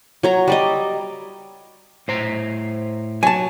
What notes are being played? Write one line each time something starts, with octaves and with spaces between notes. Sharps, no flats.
F#3 C#5 A#5
G3 D5 D#5
A2 C5 A#5
F#3 G#5 A5